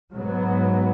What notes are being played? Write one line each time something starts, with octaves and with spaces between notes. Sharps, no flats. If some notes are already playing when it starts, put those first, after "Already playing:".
G#2 F#3 B3